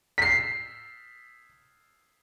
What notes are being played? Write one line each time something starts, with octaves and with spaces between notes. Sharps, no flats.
B6 C7